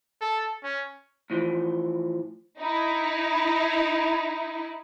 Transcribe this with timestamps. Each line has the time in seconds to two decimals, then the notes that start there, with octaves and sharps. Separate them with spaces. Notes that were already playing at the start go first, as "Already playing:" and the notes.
0.21 A4
0.63 C#4
1.30 A2 E3 F3
2.59 D#4 E4